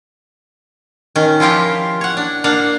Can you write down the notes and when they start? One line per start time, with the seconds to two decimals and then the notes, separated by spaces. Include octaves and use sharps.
1.16 D#3 C#4
1.40 F3 E4 F4 G4 A#4
2.01 C#5 F#5
2.17 D4
2.44 A#3 D4 F5 F#5